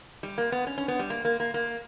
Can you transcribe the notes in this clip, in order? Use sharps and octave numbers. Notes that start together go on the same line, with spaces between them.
G3
A#3
B3
C#4
C#4
B3
G3
A#3
A#3
A#3
A#3